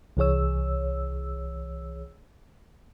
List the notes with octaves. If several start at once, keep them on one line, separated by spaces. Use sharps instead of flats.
C2 E3 G#4 C#5 E6